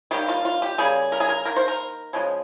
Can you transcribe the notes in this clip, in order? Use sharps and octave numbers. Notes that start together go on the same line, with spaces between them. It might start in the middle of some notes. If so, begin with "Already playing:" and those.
D#3 G3 A#3 G4
F4
F4
G4
C#3 G3 A#3 G#4
A#4
G#4
A#4
D#3 A#3 A#4
C5
A#4
C#3 F3 G#3